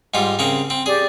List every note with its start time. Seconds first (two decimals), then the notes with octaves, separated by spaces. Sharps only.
0.14 G#2 G3 F4
0.39 C#3 C4 A#4
0.70 C4
0.86 G4 G#4 D5